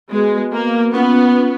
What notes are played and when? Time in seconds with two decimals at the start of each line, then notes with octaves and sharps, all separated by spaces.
0.11 G#3 B3 F#4 B4
0.53 A#3
0.94 B3 C#4 F4 B4 F#5